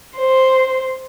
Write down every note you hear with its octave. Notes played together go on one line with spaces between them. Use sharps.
C5